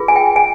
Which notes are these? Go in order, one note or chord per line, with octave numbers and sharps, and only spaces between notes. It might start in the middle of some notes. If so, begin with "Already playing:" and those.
Already playing: F4 G#4 B4
G#5
G5
G#5